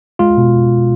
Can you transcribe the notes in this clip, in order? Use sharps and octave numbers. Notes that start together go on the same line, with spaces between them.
G#3 F4
B2